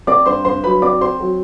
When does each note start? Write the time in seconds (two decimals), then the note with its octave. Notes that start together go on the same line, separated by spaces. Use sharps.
0.07 C4 D5 D6
0.26 G2 C5 C6
0.45 G2 C5 C6
0.63 F#3 B4 B5
0.82 C4 D5 D6
1.01 C4 C5 C6
1.20 F#3